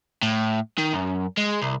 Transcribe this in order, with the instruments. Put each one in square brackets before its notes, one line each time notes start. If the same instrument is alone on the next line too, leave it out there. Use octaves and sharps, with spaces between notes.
[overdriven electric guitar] A2
D#3
F#2
G#3
C2